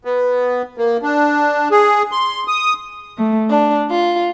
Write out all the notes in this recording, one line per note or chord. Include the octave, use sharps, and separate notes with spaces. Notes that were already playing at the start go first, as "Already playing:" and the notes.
B3
A#3
D4
G#4
C6
D#6
A3
D4
F4